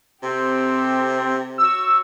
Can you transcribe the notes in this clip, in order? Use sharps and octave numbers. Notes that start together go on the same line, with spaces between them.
C3 C4 G4 A4
F#4 C#5 E6